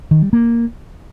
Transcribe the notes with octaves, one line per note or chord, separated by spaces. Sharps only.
D#3
G3
A#3